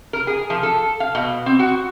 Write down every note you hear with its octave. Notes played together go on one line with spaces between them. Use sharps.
A#4
G#4
F3
A4
F5
B2
C4
F#4